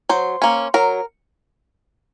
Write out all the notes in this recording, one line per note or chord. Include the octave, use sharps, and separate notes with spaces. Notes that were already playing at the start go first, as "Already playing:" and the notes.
F#3 C5
A#3 C#4
F#3 A#4